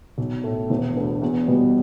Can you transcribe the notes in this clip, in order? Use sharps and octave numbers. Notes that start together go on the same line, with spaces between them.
B1
A2 A3
E1
D2 D3 B3
E2
B2 G3 B3